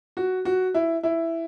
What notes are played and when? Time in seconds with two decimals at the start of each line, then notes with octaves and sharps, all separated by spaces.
0.17 F#4
0.45 F#4
0.74 E4
1.03 E4